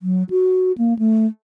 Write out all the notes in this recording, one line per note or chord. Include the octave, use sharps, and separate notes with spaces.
F#3
F#4
A#3
A3